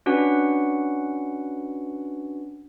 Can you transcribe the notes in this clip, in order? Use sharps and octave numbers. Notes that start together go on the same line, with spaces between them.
C#4 D4 F#4 B4 F#5